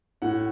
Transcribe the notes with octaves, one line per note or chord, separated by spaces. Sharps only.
A2 F#5